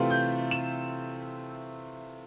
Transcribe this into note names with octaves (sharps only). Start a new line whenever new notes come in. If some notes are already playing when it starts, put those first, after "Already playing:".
Already playing: C3 E3 A3 C4 F4
G6
E7